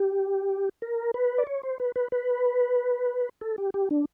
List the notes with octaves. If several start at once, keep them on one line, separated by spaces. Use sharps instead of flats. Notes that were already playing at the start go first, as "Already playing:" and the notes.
Already playing: G4
A#4
B4
D5
C#5
C5
B4
B4
B4
A4
G4
G4
D4